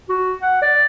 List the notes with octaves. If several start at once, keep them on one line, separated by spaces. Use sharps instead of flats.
F#4
F#5
D5